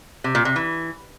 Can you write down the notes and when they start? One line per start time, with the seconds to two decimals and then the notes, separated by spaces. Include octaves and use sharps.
0.24 C3
0.35 A#2
0.45 C3
0.56 E3